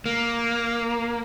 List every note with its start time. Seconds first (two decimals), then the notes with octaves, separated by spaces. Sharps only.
0.06 A#3